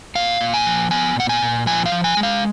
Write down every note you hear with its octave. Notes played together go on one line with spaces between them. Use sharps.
A#2 F5
A#2
G#5
F3
B3 G#5
A#2 F#5
G#5
A#2
F3 G#5
F5
F3
G#5
G#3
F5